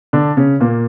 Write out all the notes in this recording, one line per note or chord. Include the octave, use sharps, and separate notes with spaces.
D3 D4
C#3 C#4
A#2 A#3